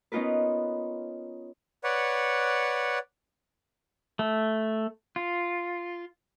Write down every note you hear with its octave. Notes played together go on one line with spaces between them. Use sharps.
B3 C#4 D#4 F4 A#4 B4
B4 C#5 D5 F#5
A3
F4